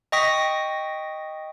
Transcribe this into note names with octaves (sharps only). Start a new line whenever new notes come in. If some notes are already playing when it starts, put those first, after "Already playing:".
D#5 G5 C#6 D#6 A#6 B6